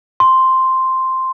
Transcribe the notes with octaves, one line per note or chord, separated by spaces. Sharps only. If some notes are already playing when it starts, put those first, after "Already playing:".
C6